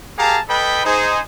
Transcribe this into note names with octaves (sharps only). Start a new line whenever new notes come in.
G4 G#4 A#4 F5 A5 A#5
A4 B4 D#5 G5 B5
D#4 G#4 C5